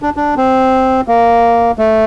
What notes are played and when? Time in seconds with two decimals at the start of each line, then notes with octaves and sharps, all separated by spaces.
0.02 D4
0.16 D4
0.37 C4
1.08 A#3
1.78 A3